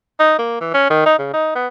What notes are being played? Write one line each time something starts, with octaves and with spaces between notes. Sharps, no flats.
D#4
A#3
E3
C#4
D#3
D#4
C#3
D#4
B3